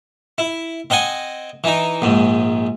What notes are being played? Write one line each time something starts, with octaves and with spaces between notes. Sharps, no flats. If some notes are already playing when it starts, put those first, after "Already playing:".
E4
C4 D#5 F#5 G#5
E3 D#4
A#1 G#2